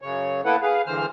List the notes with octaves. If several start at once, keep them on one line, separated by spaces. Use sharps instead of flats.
F#2 C#3 C#5
A#3 B3 E4 A4 B4 F#5
G#4 B4 F5
G2 D3 E3 G#3 C5 F6